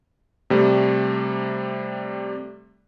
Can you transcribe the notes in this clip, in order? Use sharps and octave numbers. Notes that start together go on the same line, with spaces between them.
C3 G3 A3